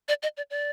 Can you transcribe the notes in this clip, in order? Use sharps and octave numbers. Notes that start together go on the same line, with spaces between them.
D5
D#5
D5
D5